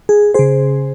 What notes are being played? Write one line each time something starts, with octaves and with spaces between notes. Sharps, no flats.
G#4
C#3 G#4 C5